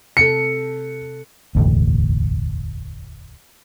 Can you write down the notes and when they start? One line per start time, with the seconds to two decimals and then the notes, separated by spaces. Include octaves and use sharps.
0.17 C3 A4 C#7
1.55 E1 A1 D2